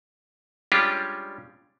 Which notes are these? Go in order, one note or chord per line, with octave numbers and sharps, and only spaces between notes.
G3 G#3 C#4 D4 F4 G4